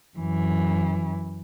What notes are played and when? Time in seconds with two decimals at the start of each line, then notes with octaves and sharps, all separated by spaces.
0.18 F#2 E3